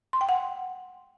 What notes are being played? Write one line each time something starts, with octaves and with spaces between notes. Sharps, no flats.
C6
G5
F#5